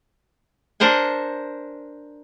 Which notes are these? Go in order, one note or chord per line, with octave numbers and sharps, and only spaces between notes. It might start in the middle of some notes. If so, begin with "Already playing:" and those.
D4 A#4 C5 F#5 G#5